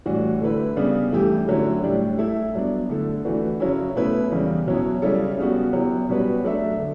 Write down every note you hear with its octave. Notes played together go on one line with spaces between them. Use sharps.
A2 E3 G3 D4 F#4
D3 A3 E4 B4
C#3 G3 B3 D4
G2 E3 A3 E4 G4
D3 F#3 A3 C#4 E4
A2 G3 D4 G4
A3 E4 A4 E5
G2 F#3 B3 D4
D3 A3 E4 A4
E3 A3 D4 F#4 B4
F#2 C#3 F#3 C#4 E4
B2 A3 C#4 E4 B4
E2 C#3 G3
B2 F#3 C#4 E4
C#3 G3 C#4 E4 A4
C#3 G3 B3 F#4
F#3 B3 E4 G4
B2 G3 C#4 F#4 B4
F#3 A3 D4 A4 E5
D3